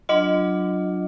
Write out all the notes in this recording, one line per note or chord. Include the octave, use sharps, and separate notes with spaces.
F#3 D4 F4 D#5